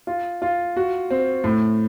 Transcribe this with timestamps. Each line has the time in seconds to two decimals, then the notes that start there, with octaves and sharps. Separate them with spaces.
0.07 F4
0.42 F4
0.76 F#4
1.10 C4
1.44 A2